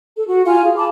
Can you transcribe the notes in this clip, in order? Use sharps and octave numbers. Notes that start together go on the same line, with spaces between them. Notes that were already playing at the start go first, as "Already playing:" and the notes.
A4
F#4
F4 F5 G#5
G#4
F5 A5 B5 D6